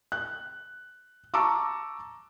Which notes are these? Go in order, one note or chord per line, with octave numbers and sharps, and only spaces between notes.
F#6
A5 A#5 C#6 D6 E6